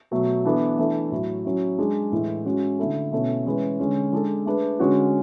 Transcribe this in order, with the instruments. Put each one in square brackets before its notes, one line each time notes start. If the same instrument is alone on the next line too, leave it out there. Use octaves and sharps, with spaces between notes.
[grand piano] B2 F#3 A3
E3 B3 D4 A4
E3 A3 D4 A4
A2 F#3 A3 E4
F#3 C#4 E4
G#3 D4 G#4
A2 E3 G#3
G#3 C#4 F#4
D3 A3 E4 A4
B2 A3 C#4 E4 A4
E3 G#3 C#4 G#4 B4
D3 G#3 C#4
G#3 D4 A4
A3 D4 G#4 B4
D3 G#3 C#4 F#4